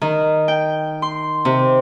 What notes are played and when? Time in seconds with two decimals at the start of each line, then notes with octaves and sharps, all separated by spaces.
0.01 D#3
0.48 G5
1.02 C6
1.45 C3